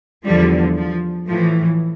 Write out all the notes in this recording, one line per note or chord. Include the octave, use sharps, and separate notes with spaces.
E2 D3 F3 G3
F3
A2 E3 F3